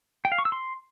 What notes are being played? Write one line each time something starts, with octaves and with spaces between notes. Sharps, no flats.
G5
F5
C#6
E6
C6